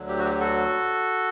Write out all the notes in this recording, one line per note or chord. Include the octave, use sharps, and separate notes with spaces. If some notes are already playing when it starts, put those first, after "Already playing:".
Already playing: D2 D3 F#3
G4
F#4
G4
G4
F#4 A4